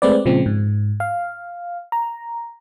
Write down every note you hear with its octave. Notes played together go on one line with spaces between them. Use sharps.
G#3 A3 C4 B4 D5
A#2 C#3 F3 G#3 C4
G#2
F5
A#5